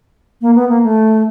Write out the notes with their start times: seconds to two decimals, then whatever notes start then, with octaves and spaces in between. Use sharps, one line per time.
0.41 A#3
0.55 B3
0.69 A#3
0.83 A3